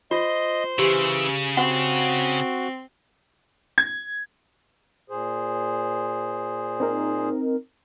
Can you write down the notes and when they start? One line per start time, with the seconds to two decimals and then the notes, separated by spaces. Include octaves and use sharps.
0.11 F4 C5 D#5
0.79 C#3 E3 G4 E6
1.57 C4 F#4 F#5
3.78 G#6
5.10 A#2 G#4 C5
6.80 C4 D#4 A#4